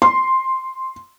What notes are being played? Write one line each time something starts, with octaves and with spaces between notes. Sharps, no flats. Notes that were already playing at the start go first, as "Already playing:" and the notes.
C6